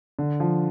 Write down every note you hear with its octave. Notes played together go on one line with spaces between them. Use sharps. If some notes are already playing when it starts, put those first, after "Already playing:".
D3
F3